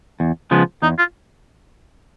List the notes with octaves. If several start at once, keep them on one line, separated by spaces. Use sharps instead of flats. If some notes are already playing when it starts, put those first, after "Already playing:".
E2
C#3 F3 G#3 B3
E2 D#4
F4